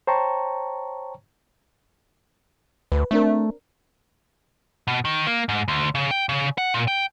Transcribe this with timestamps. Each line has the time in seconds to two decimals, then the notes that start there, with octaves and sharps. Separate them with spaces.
0.07 C5 C#5 G5 A5 A#5 C#6
2.92 D2 B4
3.11 A3 C4 D4 A#4
4.87 B2
5.05 D#3
5.27 A#3
5.49 G#2
5.68 D2
5.95 C#3
6.11 G5
6.29 C#3
6.58 F#5
6.74 A#2
6.88 G5